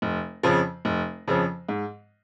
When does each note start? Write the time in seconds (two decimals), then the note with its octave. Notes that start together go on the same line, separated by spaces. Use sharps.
0.02 F1
0.43 F2 C#3 F3
0.85 F1
1.28 F2 C#3 F3
1.69 G#2